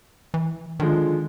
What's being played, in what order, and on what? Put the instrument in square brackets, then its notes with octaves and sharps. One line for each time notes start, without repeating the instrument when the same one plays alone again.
[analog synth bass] E3
[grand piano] D3 F3 G#3 [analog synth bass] D#3